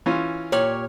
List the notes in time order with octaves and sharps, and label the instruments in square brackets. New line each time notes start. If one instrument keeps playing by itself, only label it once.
[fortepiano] E3 C#4 F4
[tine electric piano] A#2 G4 F6 [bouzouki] C#5